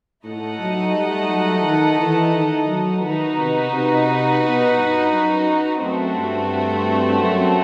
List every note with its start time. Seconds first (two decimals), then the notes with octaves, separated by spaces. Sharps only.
0.24 A2 A3 D#4 A4 D#5 F#5
0.59 F#3
0.94 G3
1.29 F#3
1.63 D#3
1.99 E3
2.33 D#3
2.67 F#3
3.01 D#3 D#4 F#4 B4
3.37 C3
3.71 C3
4.41 B2
4.76 G2
5.10 F#2
5.80 F#2 A3 C4 F#4
6.14 G2
7.19 F#2